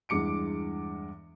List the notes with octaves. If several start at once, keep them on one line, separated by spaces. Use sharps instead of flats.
E2 G2 G#3 D6 C#7 D7